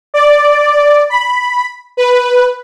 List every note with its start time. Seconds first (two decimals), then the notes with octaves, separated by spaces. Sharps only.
0.14 D5
1.10 B5
1.97 B4